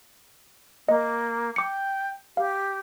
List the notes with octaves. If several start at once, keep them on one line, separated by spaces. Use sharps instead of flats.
A#3 D#5
G5 D6 C#7
G4 F5